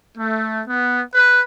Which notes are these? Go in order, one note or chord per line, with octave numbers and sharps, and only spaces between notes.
A3
B3
B4